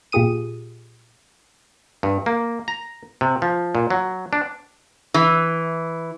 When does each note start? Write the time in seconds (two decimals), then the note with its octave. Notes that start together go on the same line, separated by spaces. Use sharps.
0.12 A#2 F4 G4 G#4 D#6 D#7
2.03 G2
2.26 A#3
2.68 A#5
3.21 C3
3.42 F3
3.75 A#2
3.90 F#3
4.33 D4
5.14 E3